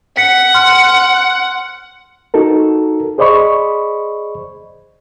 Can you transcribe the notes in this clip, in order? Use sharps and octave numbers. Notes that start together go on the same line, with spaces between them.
F#5 B6 C#7
C6 F6
D#4 F#4 A4 A#4
G#4 C5 D5 D#5 B5 C#6